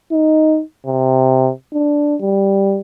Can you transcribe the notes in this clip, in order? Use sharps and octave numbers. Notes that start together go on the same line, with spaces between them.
D#4
C3
D4
G3